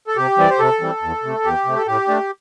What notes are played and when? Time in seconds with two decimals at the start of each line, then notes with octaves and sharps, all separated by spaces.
0.07 A4
0.16 C3 G4
0.38 E3 G3 C4 D5
0.50 C5
0.59 C3 A4
0.80 E3 G3 C4
1.02 E2
1.23 C3 A3
1.44 E2 G4
1.65 C3 A3
1.76 A4
1.86 A2 G4
2.08 A3 D4